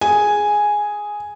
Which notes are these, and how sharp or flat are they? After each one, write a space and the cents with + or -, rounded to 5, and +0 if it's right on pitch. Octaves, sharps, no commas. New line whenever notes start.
G#4 +0 G#5 +0